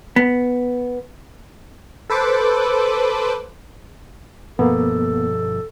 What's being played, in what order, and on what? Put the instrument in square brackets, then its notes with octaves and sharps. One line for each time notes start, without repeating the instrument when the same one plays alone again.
[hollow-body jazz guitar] B3
[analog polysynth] A4 B4 C5 D6
[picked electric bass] G2 B2 F3 [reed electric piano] A#3 B3 [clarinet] A4